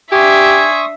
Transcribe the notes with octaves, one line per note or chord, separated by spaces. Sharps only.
D4 G4 E5 G#5 C6 C#6 D#6